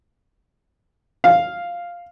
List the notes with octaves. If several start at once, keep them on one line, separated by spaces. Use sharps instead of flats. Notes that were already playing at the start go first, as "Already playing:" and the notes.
F5